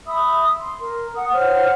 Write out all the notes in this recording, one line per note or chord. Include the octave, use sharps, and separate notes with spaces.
E5 B5 D#6 E6
C6
A#4
F#5 D#6
C5 C#5 F#5 F6